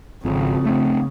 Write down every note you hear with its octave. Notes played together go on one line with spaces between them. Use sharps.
G#1 F2 C#3
A3 C4